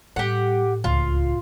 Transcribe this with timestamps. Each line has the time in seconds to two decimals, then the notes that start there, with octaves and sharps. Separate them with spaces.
0.16 A2 G3 G4 F#5
0.84 D1 C#2 F4